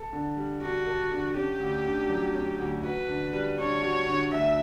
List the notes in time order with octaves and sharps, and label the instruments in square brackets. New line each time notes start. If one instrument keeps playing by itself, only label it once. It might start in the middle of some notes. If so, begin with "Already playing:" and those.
Already playing: [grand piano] A4
D3
G3
[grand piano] D4 [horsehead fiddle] F#4
[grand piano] A4
D3
[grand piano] C#4 [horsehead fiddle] G4
[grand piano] D2
D3
F#3
C#4
D2
[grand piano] F#4 [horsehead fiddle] B4
[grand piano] D3
G3
[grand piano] D4 [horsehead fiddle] C#5
[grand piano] F#4
D3
[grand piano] D2 [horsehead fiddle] E5